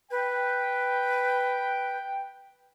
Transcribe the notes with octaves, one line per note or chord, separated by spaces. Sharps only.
B4 G5